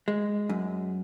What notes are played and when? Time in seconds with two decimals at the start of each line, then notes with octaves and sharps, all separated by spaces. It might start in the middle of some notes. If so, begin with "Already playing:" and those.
0.08 G#3
0.49 F#2